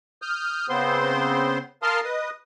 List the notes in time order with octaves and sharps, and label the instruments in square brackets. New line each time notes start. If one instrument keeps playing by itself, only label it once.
[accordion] D#6 F6 G6
C#3 B3 C4 C5 C6
A#4 F5 A5 C6 D#6 F6
B4 D#5 D#6